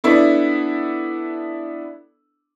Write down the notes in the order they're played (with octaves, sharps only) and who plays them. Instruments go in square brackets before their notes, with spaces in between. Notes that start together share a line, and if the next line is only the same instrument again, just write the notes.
[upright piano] B3 D4 E4 A4